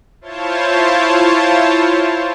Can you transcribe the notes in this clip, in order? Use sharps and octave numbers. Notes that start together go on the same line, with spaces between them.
E4 F4 C5 C#5 A5